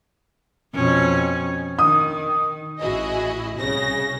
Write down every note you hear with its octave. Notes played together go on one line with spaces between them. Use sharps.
F2 B2 C#4
D#3 D#6
A1 E4 F#4 G#4 D#5
C2 C#3 A#6